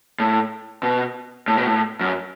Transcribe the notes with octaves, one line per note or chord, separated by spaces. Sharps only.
A2
B2
A2
B2
A2
F#2